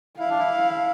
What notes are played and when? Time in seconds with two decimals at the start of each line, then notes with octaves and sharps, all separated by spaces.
0.19 E4 F5
0.30 D4
0.39 E4